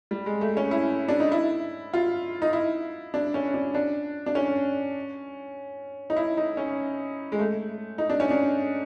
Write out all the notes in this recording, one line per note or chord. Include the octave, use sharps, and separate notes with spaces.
G3
G#3
A3
C#4
E4
D4
D#4
E4
F4
D#4
E4
D4
C#4
D4
D4
D4
C#4
D#4
E4
D#4
C#4
G#3
A3
D#4
D4
C#4
D4